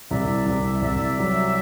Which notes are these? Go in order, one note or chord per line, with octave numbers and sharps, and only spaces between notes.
C2 D5 E5
C2
C2 D5 E5
F#3